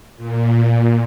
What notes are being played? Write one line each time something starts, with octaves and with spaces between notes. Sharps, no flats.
A#2